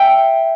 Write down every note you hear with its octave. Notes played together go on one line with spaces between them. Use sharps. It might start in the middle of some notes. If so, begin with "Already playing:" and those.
Already playing: E5 G5